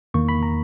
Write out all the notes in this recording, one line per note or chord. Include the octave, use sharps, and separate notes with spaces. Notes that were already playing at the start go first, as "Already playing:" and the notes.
E2 D#3 A#3 C#6
B5
A#5